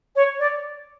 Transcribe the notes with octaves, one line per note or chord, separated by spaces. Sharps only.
C#5
D5